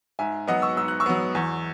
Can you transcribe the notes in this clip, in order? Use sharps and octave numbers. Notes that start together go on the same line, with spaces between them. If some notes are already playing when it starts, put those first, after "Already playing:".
G#2 E5 G#5
F#3 B3 D#5 F#5
C#6 E6
G#2 E6
F#6
C#6 E6
F#3 B3
E2